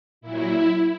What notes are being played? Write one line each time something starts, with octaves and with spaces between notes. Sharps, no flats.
A#2 F#3 E4